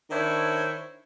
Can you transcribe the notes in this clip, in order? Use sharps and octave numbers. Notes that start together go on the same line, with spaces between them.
D#3 D4 E4 C5 C#5